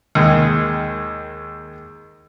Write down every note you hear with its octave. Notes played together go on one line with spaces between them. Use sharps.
D#2 D#3 G#3